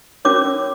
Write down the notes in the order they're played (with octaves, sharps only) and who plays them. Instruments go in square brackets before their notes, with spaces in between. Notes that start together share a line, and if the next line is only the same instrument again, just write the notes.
[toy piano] C#4 F#4 A#4 C#5 D6